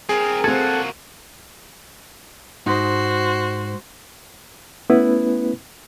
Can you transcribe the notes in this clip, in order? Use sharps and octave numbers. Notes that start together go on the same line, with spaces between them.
C4 G#4 A#4
A#3 C4 F#4 A4 F#5 G#6
G#2 D#4 F#4 C5 C6
A3 B3 C#4 E4 B4